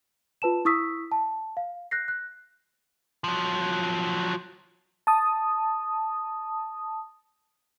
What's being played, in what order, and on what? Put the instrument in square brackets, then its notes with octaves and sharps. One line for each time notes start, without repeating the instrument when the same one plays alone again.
[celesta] F4 B4 A5 E7
E4 C#6 D#6 E6 B6
A5
F5
F#6 G6 A#6 C7
F#6
[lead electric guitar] F3 F#3
[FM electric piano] A5 D#6